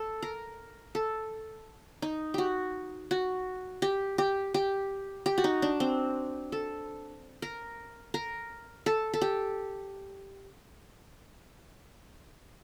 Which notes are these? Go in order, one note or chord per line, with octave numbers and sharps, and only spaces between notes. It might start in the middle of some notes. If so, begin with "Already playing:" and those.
Already playing: A4
A#4
A4
D#4
F#4 G4
F#4
G4
G4
G4
G4
F#4
D#4
D4
C4
A4
A#4
A#4
A4
A4
G4